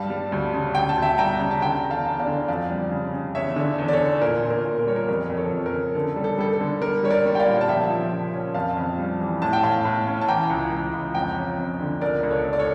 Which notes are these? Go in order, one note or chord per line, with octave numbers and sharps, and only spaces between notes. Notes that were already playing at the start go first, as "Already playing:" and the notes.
Already playing: G2 G3 F5 A5
G3
D2
C#3
D2 G5
A5
D2
E5 G5
G3 G5 A#5
C#3
A5
D3 G5 A#5
E2 A#5
F5 A5
E2
D5 F5
D3
F2 D5 F5
G3
C#3
C#3
E2 C#5 E5
D3
E2
D5
A4 C#5
D3
A#2 A#4
A#2
A#4
A#2
A#4
G3 C#5
A#4
F2 A#4
F2
A4 C#5
F2
A#4
C#3
D3 A4
G3
A4
G3 A4
A4
D3
G3 A#4
G3 C#5
A#4 D5
G3
G5
D5 F5
A#2
A5
F3 E5 G5
F3
C#3
C#4
F2 F5 A5
F2
G3
E3
A2 A5
G5
A2 F5 A5
A2
C#4
A5
E3 G5 A#5
C#2
C#2
C#2
F2 G5 A#5
C#4
F2
D3
C#2 A#4 D5
C#2
A4 C#5
C#2
D5
A4 C#5